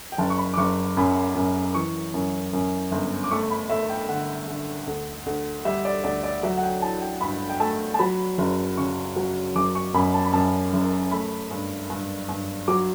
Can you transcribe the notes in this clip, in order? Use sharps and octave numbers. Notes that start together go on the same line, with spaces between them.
G5
F#1 A5
C#6
B5
D6
F#1 C#6
F#2 B5
F#2
E3 C#6
F#2
F#2
G1
D6
A3 C#6
B5
A3 E5
G5
D3 F#5
D3
D2
D2
G3 E5
D5
D2 D5
D5
F#3 E5
F#5
G5
E4 A5
G5
G2 B5
G5
A3 A5
A5
F#3 B5
F#1
C#3 C#6
F#3
F#1 D6
C#6
F#2 B5
A5
B5
F#2 A5
F#1
A3 B5
G2
G2
G2
F#3 D6